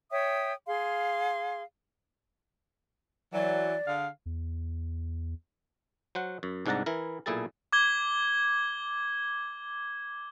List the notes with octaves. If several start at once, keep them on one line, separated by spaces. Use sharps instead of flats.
C#5 E5 G5 D#6
G#4 F5 C6
E3 F#3 D5
D3 G#4 F5
E2
F#3 C5 F#5
F#2
C2 G#2 D4 F#5 A5 A#5
E3 E4 A#4
B1 A#2 E4 G#4 A4 A5
D6 G#6 G7